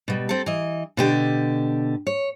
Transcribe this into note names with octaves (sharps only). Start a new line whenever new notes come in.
B2 G3
C4 A4
E3 D#5
B2 D3 G4
C#5